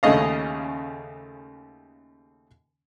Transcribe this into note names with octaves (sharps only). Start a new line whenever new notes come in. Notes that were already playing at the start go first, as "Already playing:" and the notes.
D#2 C#3 A3 C#4 D#5 F5